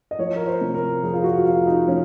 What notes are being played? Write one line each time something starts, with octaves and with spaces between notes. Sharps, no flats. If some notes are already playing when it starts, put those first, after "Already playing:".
D#5
F3 C#5
A#4
C5
C3
A#4
F2 G#4
F4
F#4
F2 F4
D#4
F3 C#4